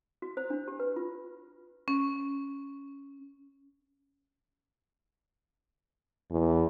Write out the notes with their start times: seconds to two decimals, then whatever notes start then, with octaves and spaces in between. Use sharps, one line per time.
0.22 F#4
0.37 C5
0.50 D4
0.68 G4
0.80 B4
0.96 F4
1.88 C#4
6.31 E2